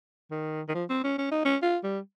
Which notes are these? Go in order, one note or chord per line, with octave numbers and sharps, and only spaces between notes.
D#3
D#3
F3
C4
C#4
C#4
D#4
C#4
F4
G3